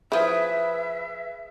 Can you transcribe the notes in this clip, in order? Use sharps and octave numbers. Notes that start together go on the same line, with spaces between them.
F3 E4 G#4 B4 E5